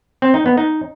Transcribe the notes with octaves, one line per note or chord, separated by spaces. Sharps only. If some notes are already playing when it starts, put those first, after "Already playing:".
C4
D#4
B3
D#4